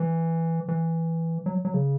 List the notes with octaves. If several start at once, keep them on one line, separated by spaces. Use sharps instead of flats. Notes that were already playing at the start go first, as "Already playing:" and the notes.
Already playing: E3
E3
F#3
F#3
C#3